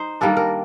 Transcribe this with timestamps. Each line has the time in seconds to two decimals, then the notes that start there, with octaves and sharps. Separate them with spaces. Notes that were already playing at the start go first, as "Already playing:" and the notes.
Already playing: D#4 C5
0.21 D#3 G3 A#3 D4 A4
0.37 A#4